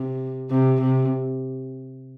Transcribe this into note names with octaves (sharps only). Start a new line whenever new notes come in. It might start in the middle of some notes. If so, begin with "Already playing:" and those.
Already playing: C3
C3
C3